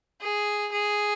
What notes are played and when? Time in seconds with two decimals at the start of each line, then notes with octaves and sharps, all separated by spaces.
0.21 G#4
0.72 G#4